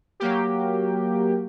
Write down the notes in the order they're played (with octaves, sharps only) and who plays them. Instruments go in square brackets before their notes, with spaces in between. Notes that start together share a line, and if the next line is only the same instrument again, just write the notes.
[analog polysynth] F#3 A#3 G4